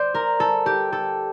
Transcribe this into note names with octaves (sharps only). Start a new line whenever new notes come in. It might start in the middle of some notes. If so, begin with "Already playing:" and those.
Already playing: C5 D5
A#4
A4
G4
A4